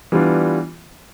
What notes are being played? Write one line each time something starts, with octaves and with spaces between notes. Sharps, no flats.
E3 G3 B3 D4 F4